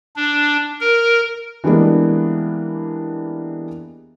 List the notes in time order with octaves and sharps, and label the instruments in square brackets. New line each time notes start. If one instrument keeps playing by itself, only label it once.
[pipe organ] D4
A#4
[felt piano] E3 G3 G#3 A#3 B3 D4